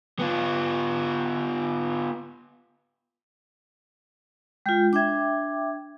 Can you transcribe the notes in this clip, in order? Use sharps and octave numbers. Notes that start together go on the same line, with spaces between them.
B3 F4
G#3 F4 G5 G6
D4 E5 G5 D6 G#6